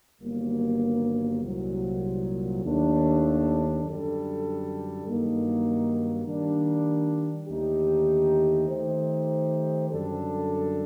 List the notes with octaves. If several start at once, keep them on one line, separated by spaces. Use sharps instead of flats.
G1 G2 D#3 F#3 A#3
C2 A#2 F#3
D#2 D#3 A3 D4 A4
F#2 D3 G3 D4 A4
G2 D#3 F#3 A#3 D#4
D#3 G3 A#3 D4
D#2 D3 A3 D#4 G4
D#3 A3 D#4 G4 C5
F#2 D3 G3 D4 A4